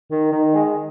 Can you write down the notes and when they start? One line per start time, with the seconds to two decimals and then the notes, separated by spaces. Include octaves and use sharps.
0.10 D#3
0.32 D#3
0.54 G#3